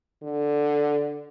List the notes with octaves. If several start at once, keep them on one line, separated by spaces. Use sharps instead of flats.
D3